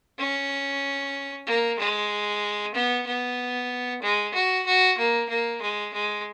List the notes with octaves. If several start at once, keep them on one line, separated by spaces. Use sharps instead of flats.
C#4
A#3
G#3
B3
B3
G#3
F#4
F#4
A#3
A#3
G#3
G#3